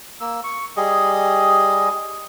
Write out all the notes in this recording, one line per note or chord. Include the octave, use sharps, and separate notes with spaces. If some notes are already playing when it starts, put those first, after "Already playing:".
A#3 E6
C#6
G3 G#4 D#5